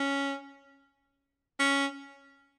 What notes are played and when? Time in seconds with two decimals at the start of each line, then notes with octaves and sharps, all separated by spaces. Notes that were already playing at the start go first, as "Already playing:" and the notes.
Already playing: C#4
1.60 C#4